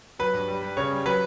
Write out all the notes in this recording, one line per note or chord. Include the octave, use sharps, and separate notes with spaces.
F#3 B4
G2
G3
G3
C#3 C#5
G3
F#3 B4